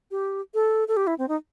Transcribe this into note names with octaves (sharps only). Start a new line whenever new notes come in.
G4
A4
A4
G4
E4
C4
D#4